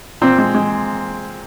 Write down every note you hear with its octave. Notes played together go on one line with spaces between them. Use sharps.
A#2 C4
G#3
G#3